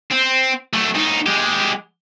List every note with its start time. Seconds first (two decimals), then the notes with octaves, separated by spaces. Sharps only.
0.11 C4
0.73 F#3 A3
0.95 A2 D#4
1.26 G#3 G4